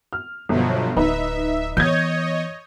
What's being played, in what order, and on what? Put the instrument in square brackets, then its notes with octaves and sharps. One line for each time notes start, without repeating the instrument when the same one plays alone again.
[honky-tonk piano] F6
[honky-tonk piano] G1 [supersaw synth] B2 F3 F#3
[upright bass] D1 [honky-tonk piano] D#4 B4 [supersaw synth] E5
[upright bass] E3 B3 [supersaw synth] C#5 D#5 [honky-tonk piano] G6 G#6